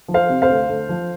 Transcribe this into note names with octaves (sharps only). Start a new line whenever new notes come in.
F3
C5 F5
C3
C5 F5
D2
D2
F3